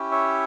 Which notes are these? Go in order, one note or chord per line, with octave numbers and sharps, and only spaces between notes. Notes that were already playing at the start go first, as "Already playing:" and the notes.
Already playing: C#4 E4 G4
C#5 E5